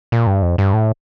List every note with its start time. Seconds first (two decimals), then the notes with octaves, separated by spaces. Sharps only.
0.12 A#2
0.27 G2
0.42 F2
0.58 G2
0.73 A2